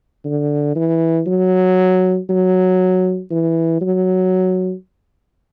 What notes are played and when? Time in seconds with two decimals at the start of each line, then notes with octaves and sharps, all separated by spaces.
0.25 D3
0.76 E3
1.27 F#3
2.29 F#3
3.31 E3
3.82 F#3